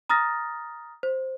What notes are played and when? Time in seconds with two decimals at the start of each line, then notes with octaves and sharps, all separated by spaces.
0.09 A#5 D#6 F6 A6 A#6
1.03 C5